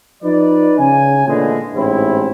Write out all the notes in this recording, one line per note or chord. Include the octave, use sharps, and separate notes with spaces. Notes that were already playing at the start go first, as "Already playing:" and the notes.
F3 D#4 B4 D5
C#3 G#5
A#2 D3 E3 G#3 A3
A1 G#2 C4 E4 C#5